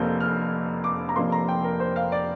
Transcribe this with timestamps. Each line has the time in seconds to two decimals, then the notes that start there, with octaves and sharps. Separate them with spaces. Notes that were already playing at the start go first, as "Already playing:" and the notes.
Already playing: F1 F2 F3 A#3 G6
0.20 F6
0.84 D6
1.09 A#5
1.16 F1 F2 F3 A#3 C6
1.32 A#5
1.48 G5
1.64 A#4
1.80 C5
1.96 F5
2.12 D5